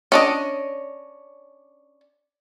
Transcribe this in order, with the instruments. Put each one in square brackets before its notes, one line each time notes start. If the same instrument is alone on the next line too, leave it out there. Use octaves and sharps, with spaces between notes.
[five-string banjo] C#4 D4 D#5